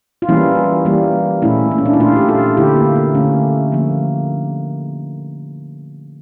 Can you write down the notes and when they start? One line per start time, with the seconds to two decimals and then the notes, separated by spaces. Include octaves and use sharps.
0.22 F4
0.28 E3 G3 A#3 C#4 E4
0.85 E3 G3 A#3
1.42 A#2 A3 C#4 E4
1.71 A#3
1.78 C#4
1.86 D4
1.93 E4
2.00 A#2 A3 D4 F4
2.16 G4
2.29 F4 A4
2.57 D3 A3 E4 G4
2.76 A#3
2.96 A#3
3.15 D3 A3 C#4
3.72 D3 F3 A#3